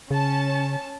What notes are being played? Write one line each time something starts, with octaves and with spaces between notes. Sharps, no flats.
C#3 C#4 A5